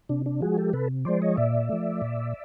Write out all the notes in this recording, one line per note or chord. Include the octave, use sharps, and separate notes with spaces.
C3 D4
D4
F3 G#3 F#4 G#4
G4 A4
C3 A4 B4
F3 G#3 C5 D5
C#5 D#5
A#2 D5 E5
F3 A3
A#2